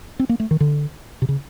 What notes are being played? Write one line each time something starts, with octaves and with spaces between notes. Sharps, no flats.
C4
A#3
A3
D#3
D3
C3
C#3